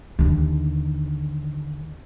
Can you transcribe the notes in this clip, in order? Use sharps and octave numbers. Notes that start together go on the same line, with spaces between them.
D#2 D3